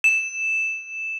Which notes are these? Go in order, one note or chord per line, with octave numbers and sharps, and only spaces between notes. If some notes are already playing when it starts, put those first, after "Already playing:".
E7